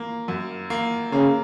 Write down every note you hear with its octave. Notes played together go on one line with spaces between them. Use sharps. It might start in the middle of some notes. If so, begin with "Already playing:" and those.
Already playing: A#3
F#2
A#3
C#3 A#3